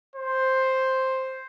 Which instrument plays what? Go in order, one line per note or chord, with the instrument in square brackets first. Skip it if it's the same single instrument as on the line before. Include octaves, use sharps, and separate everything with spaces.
[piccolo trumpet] C5